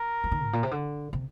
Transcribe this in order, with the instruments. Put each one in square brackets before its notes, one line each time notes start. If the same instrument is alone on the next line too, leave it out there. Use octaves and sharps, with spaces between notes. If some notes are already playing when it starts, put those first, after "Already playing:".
Already playing: [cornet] A#4
[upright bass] F3
D#3
G#2
A#2
C3
D3
C3